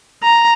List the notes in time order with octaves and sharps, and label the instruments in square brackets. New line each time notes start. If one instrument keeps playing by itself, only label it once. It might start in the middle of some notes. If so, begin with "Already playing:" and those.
[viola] A#5